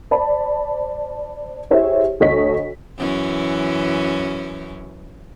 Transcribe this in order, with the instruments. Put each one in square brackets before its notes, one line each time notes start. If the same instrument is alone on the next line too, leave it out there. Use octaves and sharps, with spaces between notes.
[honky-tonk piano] C5 D5 A5 B5
E4 G4 G#4 C5 C#5 E5
D2 A4 C#5 D#5 C#6 B6
[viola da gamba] F#2 E3 C#4